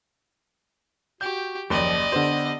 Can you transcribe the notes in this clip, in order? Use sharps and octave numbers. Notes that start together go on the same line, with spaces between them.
F#4 G4 G6
F#1 D#2 F3 D5 D#5 G7
D3 B3 G4 C5